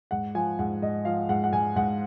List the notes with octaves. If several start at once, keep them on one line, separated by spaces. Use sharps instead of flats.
G#2 F#5
F3 G#5
G#2 F#5
G#2 D#5
F3 F5
G#2 F#5
F#5
G#2 G#5
G#2 F#5